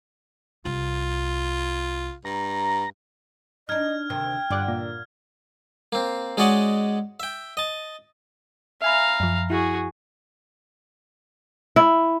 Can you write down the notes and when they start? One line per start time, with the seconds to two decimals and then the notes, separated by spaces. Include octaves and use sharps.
0.65 C2 C#4 F4
2.25 G2 A#5
3.69 D4 D#4 D#5 F6 G#6
4.10 D2 C3 D#3 G5 F6
4.51 G2 D3 F4 D5 F#5
4.68 A#2
5.92 A#3 C4
6.37 G#3 C#4 F#4 D5 D#5 F#5
7.20 E5 G5
7.57 D#5 A5
8.82 E5 F5 G#5 A#5 B5
9.20 F#2 F3
9.50 E4 F#4 G#4
11.76 E4